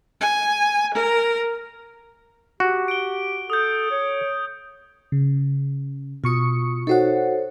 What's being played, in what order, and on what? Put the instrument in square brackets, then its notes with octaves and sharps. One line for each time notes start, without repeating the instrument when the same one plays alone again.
[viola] G#5
A#4
[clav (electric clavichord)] F#4 [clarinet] G4
[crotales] D7 G7
[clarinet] A4 [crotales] D#6 G6
[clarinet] C#5
[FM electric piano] C#3
[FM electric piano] B2 C#6 C#7 [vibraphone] F4 D#6
[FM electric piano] D#4 F#4 F#5 [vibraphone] A4 C5 C#5